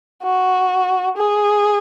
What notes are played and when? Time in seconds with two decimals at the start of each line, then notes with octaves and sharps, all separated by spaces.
0.23 F#4
1.17 G#4